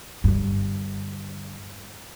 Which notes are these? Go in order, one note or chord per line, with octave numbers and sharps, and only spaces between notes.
G2 D3